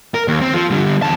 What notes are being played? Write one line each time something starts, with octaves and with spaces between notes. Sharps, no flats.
A#4
D#2
C4
F3
D3 G3
E2 A5